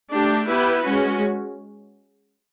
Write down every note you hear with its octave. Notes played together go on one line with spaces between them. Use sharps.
A3 D4 G4
B3 E4 G4 B4
G#3 C#4 F#4